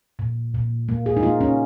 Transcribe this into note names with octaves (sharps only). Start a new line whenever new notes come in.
A#2
A#2
A#3
G#4
D#4
A#3 F4
C#4